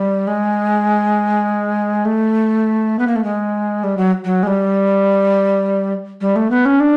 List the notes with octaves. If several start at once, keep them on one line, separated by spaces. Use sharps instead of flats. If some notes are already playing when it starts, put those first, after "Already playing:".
Already playing: G3
G#3
A3
B3
A#3
A3
G#3
G3
F#3
F#3
G#3
G3
G3
A3
B3
C#4
D4